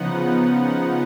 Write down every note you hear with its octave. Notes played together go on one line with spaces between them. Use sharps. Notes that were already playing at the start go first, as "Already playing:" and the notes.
Already playing: C#3 F3 B3 D#4 F#5